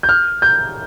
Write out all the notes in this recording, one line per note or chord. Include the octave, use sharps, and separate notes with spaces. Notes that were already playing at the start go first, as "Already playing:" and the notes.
G6
F6
G6